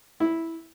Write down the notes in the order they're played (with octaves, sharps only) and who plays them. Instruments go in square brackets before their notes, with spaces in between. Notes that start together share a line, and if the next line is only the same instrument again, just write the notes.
[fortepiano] E4